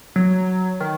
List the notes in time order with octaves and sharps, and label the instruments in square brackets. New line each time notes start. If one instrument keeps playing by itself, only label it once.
[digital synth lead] F#3
D#3